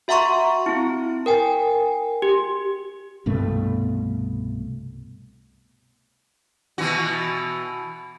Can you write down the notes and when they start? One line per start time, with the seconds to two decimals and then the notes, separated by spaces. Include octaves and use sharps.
0.08 F#4 E5 F#5 A#5 C6 C#6
0.66 C4 E4
1.26 A#4 G5 G#5
2.22 G4
3.26 C2 G2 B2 A3
6.78 B2 E3 F#4